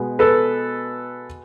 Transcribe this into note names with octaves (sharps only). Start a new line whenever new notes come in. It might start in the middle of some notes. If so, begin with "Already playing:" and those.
Already playing: B2 G#3 B3
A4 B4